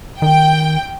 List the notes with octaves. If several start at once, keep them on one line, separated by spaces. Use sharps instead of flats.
D#3 G5